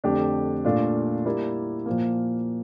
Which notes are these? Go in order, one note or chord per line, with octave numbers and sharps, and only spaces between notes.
F2 D3 A3 D4 G4
A#2 A3 D4 F4
G3 A#3 E4 A#4 D5
A#2 F3 A#3